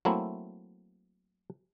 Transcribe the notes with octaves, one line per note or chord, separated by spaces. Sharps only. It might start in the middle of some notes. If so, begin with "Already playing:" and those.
F#3 A3 A#3 C4 E4